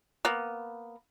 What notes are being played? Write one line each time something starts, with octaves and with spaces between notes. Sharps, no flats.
A#3 B3